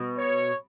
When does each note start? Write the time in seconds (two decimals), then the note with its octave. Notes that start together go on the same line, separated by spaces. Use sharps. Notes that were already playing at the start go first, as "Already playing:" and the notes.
Already playing: B2
0.18 C#5